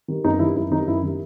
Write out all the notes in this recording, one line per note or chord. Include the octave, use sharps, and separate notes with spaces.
D#3 G3
F#2 D#4
D#3 G3 E4
F#2 E4
D#3 G3 D#4
F#2 E4
D#3 G3